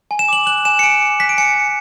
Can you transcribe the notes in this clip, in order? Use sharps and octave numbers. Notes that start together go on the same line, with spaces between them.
G#5
E7
D6 F#7
F#6 F#7
G#5 E7
C#7
G#5 D7
D6
F#6 B6
D7
G#5 C#7
G#5